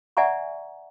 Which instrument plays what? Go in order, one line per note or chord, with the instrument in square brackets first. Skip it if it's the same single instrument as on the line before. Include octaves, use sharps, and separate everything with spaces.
[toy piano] D5 E5 F#5 G#5 A#5 C#6